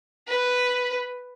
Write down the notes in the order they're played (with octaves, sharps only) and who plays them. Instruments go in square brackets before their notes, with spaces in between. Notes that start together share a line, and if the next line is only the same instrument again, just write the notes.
[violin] B4